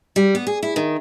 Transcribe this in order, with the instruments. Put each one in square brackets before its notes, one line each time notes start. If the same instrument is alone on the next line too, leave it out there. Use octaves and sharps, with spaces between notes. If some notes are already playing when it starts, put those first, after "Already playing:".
[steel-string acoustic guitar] G3
B3
G#4
E4
D#3